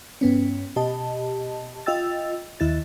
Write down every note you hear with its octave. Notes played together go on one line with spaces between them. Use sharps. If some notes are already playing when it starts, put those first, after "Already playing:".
G2 B3 C#4
B2 G4 D#5 A5
F4 D#5 G5 E6 A6
D#2 E4 A6